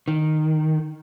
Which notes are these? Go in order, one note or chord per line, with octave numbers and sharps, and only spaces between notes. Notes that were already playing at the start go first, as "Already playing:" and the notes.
D#3